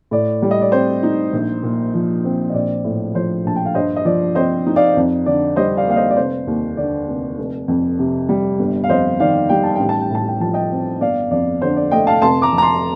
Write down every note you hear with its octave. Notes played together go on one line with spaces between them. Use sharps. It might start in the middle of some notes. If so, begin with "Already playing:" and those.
A2 D5
G3 D5
D#5
D5
C4 C5
D#4
A#1
A#2
F3
C4
D#5
A#1 D5
A2
F3 C5
A#1 A5
G5
F5
G2 C5 D#5
D#5
F3 D5
C4 C5 D#5
D#4
D5 F5
F2
D3 D5
G3 C5 D#5
D5 F5
A#3 F5
C5 D#5
D5
F1 C5
D#2
D3 D5
F1
F1
F2
C3
G3
G1
F5
F2 C5 D#5
D#3 D5 F5
G3 G5
A5
A1 G5
A5
G5
A2 A5
G5
F3 A5
D#5 G5
C4
G1 D5 F5
F2 D5
D3 C5
D5
A3 D#5 G5
F5 A5
F1 A5 C6
A#5 D6
F2
A#5
A5 C6